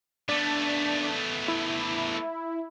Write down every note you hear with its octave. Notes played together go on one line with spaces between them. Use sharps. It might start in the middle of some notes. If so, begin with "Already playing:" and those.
A3 B3 D4
E4